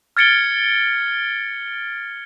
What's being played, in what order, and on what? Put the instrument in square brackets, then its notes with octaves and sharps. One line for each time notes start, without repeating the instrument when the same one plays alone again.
[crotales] F6 G#6 A6 C#7 D7 G7